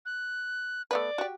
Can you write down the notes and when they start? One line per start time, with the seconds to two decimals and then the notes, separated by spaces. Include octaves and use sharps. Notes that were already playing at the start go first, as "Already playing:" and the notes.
0.05 F#6
0.91 A3 B3 B4 D5
1.18 F#4 G4